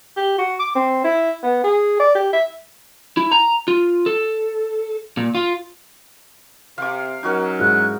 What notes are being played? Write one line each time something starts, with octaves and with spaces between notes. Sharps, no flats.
G4
F#4
D6
C4
E4
B3
G#4
D5
G4
E5
E4
A#5
F4
A4
A#2
F4
C3 F5 D6
F#3 C#4 D#4 F#4 A#4
G#2 E4 F#6